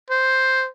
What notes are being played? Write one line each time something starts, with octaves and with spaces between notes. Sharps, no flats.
C5